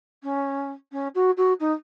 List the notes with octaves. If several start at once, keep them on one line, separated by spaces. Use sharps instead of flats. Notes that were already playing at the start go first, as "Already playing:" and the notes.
C#4
C#4
F#4
F#4
D#4